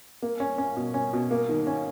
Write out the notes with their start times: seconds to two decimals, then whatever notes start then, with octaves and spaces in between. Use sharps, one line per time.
0.22 A#3
0.40 C#4
0.58 C#4
0.77 B2
0.94 C#4
1.13 B2
1.31 A#3
1.49 D#3
1.67 C#4